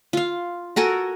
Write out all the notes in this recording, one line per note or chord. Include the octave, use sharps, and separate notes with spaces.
F4 F5
F#4 A4 A#4 G#5